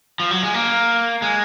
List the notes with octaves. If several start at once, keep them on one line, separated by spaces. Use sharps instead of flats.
F3
F#3
G#3
A#3
G#3